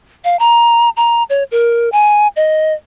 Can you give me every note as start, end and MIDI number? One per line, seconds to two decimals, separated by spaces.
0.24 0.38 77
0.39 0.89 82
0.97 1.23 82
1.30 1.43 73
1.52 1.89 70
1.92 2.28 80
2.36 2.74 75